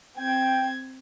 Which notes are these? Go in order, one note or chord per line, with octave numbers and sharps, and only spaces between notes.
C4 G5 G#6